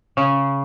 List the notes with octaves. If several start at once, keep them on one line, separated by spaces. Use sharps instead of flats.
C#3